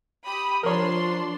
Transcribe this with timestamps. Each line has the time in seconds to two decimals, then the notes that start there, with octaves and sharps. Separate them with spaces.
0.25 G4 B5 D#6
0.63 F3 D4 A#4 C#5 C6